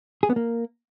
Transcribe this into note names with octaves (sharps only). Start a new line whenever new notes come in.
G#4
B3
A#3